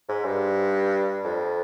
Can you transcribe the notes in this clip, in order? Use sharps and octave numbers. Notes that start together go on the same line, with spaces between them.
G#2
G2
F2